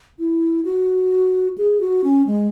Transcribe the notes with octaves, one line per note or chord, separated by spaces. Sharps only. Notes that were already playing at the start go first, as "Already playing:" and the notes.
E4
F#4
G#4
F#4
C#4
G#3